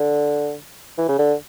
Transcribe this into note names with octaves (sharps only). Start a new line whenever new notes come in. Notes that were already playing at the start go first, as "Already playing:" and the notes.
Already playing: D3
E3
C#3
D3